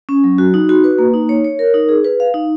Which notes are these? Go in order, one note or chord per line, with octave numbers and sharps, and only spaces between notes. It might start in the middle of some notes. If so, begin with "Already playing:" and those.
C#4
F#3
F#4
D#4
F#4
B4
A#3
D#4
C#5
C#5
A#4
D#4
G#4
B4
F5
D#4